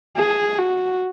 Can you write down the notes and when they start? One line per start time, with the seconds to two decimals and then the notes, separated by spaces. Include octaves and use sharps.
0.17 G#4
0.59 F#4